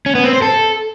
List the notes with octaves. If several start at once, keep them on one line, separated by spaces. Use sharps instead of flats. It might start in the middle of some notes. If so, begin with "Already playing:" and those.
C#4
B3
C4
C5
A4